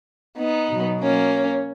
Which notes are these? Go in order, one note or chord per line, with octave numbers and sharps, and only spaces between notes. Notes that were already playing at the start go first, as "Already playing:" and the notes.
B3 D#4
B2 F#3
A#3 C#4